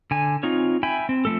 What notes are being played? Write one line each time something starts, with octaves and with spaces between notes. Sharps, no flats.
D3 G#5
C4 D#4 F4 C#5
E5 G5 G#5 B5
C4
F3 A3 A4